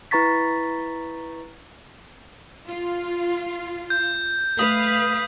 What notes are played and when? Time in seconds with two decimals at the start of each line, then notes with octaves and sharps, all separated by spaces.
0.11 E4 B4 A#5 C#6 A6 B6
2.68 F4
3.90 G6
4.59 A3 B4 F5 D#6